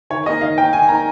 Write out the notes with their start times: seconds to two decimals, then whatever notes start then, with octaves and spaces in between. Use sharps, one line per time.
0.10 D#3 C#5
0.26 A#3 D#4 D#5
0.41 D#3 F5
0.58 A#3 D#4 G5
0.73 D#3 G#5
0.89 A#3 A#5
0.92 D#4